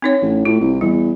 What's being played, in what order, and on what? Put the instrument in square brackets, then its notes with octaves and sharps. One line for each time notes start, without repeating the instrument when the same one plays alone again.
[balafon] C4 D#4 C#5
[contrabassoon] A1
[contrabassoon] A2 [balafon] F4
[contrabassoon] C2
[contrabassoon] E2 [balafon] G3